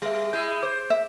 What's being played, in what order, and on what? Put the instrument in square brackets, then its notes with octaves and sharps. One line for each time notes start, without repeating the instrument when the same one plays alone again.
[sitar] G3 [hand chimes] G#4 E5
[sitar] G#3 E4 G#4 [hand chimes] G6
[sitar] C5 [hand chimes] D6
[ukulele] E5